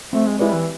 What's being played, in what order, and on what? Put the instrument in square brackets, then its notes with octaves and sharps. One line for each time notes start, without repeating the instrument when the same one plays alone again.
[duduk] A3 [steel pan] C4
[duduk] G#3
[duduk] G#3 [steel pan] E4 G4 B4 D5
[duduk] E3